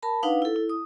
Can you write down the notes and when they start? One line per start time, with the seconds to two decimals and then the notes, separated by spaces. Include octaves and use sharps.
0.03 A#4 A5 B5
0.23 D4 D#4 B4 F5 F#5
0.42 E4 A4
0.56 E4
0.69 D#6